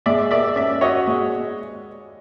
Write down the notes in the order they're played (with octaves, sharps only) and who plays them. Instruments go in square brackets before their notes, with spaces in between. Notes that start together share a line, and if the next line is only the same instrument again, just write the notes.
[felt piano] G#3 [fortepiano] D5 E5
[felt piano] A#4 [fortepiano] D5 E5
[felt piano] C#4 [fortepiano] D5 E5
[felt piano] F#4 [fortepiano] C#5 D#5
[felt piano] G#3